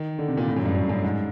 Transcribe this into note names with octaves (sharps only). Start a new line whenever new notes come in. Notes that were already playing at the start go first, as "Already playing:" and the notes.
Already playing: D#3
D3
C3
A#2
A2
F#2
G2
F#2
F#2
G#2